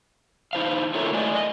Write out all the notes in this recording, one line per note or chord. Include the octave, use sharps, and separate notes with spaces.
D#4 E4 C5 F5
F4 A4 A#4 C#5 E5
A3 D5 D#5 G#5
D#5